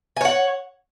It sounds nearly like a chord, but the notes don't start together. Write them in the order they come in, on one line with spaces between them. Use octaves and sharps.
G#5 C#5 F#5